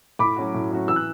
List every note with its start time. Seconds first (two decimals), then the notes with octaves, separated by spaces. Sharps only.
0.19 A2 B5 D6
0.36 F#3 C#4 F#4
0.54 A2
0.71 F#3 C#4 F#4
0.88 E3 E6
0.96 F#6